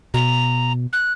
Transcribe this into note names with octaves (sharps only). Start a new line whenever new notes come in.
B2 A#5
F#6